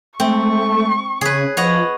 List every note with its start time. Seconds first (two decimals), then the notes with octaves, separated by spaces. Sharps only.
0.20 G#3 A3 C4 C#6
1.21 C#3 G#4 B4 C#5
1.57 F3 B4 C#5 D#5 F#5 B5